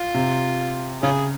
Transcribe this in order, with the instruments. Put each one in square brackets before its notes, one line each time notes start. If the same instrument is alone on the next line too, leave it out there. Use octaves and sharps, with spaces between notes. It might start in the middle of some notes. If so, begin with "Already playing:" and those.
Already playing: [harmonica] F4
[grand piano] C3
[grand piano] C#3 [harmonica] C#4 F4 G#4